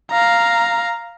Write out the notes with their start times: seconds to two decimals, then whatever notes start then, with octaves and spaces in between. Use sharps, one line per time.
0.11 F5 A#5